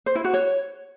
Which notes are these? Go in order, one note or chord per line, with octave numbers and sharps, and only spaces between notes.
C5
E4
F#4
C#5